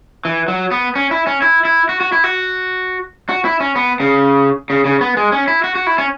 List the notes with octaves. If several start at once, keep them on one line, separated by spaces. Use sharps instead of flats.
E3
F#3
B3
C#4
E4
C#4
E4
E4
F#4
F#4
E4
F#4
F#4
E4
C#4
B3
C#3
C#3
C#3
B3
G#3
C#4
E4
F#4
F#4
E4
C#4